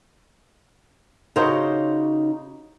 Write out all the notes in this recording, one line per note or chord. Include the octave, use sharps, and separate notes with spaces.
C#3 D#4 F#4 G4 C5 C#5